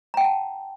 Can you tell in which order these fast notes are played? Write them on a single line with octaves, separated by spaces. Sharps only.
A#5 G5 F#5 A5